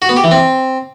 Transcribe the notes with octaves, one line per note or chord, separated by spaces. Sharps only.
F#4
B3
G4
E3
C4